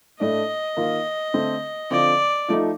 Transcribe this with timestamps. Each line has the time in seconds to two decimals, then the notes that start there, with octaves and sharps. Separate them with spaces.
0.20 A2 A3 D4 D#5
0.77 D#3 A#3 F4
1.34 D3 A3 C4
1.91 D3 F3 C4 F4 D5
2.48 F3 A3 D#4